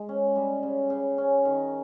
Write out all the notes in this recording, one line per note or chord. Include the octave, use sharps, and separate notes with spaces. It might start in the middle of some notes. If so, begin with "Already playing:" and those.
Already playing: G#3
C#4
G3
C#3
C#3
C#4
D#3